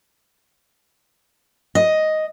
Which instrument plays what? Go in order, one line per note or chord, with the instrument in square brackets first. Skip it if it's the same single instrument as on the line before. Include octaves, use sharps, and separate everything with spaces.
[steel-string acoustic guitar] D#5